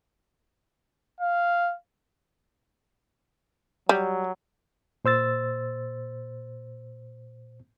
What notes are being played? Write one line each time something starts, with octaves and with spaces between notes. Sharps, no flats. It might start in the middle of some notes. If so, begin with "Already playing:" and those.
F5
F#3 G3
A#2 C5 E6 A6